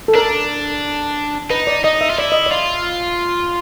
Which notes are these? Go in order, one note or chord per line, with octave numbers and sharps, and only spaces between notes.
A4
D4 A#4
D#4 B4
D5
D#4 D#5
E5
F4
E4 D5
D#5
D5
F4